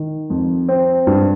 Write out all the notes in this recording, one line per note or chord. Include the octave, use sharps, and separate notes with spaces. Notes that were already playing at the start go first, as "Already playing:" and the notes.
Already playing: D#3
F2
C4
G2